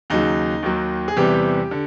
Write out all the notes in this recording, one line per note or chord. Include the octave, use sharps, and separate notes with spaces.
D#2 C#3 F#3 D#4
D#2 D#3 F#3
G#4
E2 C3 E3 G3 G4
D3